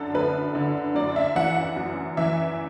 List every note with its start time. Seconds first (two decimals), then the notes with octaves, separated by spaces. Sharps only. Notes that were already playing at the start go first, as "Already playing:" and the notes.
Already playing: F#2 D3 A4
0.14 F#2 B4
0.55 D3
0.95 F#2 D5
1.16 E5
1.35 E3 F#5
1.57 F#5
1.76 F#2
2.17 E3 E5